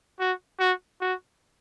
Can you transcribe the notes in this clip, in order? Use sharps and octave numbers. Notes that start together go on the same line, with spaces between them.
F#4
F#4
F#4